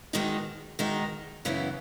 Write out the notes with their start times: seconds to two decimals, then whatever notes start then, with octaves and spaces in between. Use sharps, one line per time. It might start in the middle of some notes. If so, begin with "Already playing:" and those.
0.13 E2 D#3 G#3 D#4 F#4
0.79 E2 D#3 G#3 D#4 F#4
1.45 F#2 C#3 E3 B3 E4